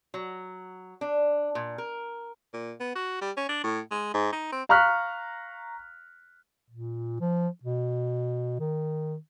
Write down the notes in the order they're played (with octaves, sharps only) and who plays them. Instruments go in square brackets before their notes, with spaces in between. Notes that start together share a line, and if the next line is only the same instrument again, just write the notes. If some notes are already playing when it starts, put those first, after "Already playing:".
[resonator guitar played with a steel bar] F#3
D4
A#2
A#4
[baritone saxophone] A#2
B3
F#4
G3
C#4
D4
A2
G#3
G#2
D#4
C4
[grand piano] F5 A#5 C#6 F6 F#6 B6
[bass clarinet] A#2
F3
B2
D#3